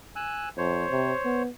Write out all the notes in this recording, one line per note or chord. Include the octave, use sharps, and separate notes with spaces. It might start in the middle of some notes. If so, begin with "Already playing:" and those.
G#5 E6 F#6
F2 C5 C#5
C3
B3